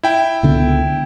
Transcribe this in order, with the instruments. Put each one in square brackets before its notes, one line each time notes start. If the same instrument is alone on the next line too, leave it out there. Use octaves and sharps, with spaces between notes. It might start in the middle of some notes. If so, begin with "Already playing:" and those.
[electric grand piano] E4 G5
[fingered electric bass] C#2 D3 B3